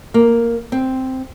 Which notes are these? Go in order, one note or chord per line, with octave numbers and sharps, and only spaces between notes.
A#3
C4